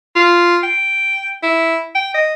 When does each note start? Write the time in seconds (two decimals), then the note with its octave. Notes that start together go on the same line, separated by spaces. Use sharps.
0.16 F4
0.63 G5
1.43 E4
1.95 G5
2.14 D#5